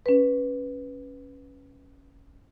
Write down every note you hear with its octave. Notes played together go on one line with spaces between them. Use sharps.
C#4 B4